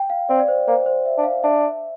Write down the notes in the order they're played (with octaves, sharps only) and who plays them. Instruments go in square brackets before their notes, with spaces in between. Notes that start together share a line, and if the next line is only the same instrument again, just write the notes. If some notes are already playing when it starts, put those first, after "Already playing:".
Already playing: [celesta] G5
F5
[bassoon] C4 [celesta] D5
[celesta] D5
C5
[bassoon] A#3 [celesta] C5
[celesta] C5
E5
[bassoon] D4
[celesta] F5
[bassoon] D4 [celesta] E5